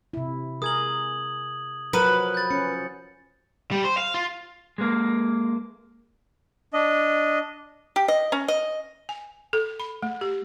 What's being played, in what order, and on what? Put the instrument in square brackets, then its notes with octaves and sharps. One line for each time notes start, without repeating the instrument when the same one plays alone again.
[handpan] C3 E4
[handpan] G#4 A#4 [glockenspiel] D#6 G#6 F#7
[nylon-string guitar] F3 F#4 A#4 [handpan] F#3 [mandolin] B4
[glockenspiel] G6 A6
[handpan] C#4 [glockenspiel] C#7
[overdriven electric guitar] G3
C5
F5
F4
[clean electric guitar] G#3 A#3
[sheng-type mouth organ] D4 D#5
[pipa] G4
D#5
C#4
D#5
[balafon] G#5
A4
B5
A3
G4